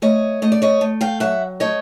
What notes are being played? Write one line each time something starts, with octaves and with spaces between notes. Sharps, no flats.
A3 C#5 D#5
A3 D#5
D5
C#5 D#5
A3
F5 G5
F#3 E5 F#5
A3 C#5 D#5